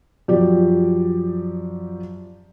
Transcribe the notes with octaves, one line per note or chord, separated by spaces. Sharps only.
F#2 F3 G4 D5